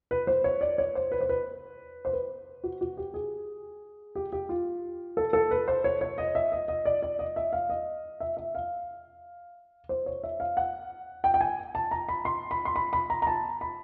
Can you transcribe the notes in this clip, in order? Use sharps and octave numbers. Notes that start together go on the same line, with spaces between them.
B4
C5
C#5
D5
C#5
C5
B4
C5
B4
C5
B4
F#4
F#4
G4
G#4
G4
G4
F4
A4
A4
B4
C5
C#5
C#5
D#5
E5
D#5
D#5
D5
D5
D#5
E5
F5
D#5
E5
E5
F5
C5
C#5
E5
F5
F#5
G5
G5
G#5
A5
A#5
B5
C6
B5
C6
B5
B5
A#5
A#5
A5
B5